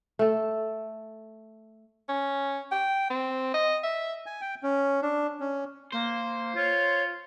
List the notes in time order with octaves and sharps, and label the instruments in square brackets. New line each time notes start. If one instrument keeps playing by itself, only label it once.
[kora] A3 A4
[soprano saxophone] C#4
G5
C4
D#5
E5
[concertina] G#5
G5
C#4
D4
C#4
[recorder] A#3 [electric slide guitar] C5
[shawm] F4 [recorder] C#5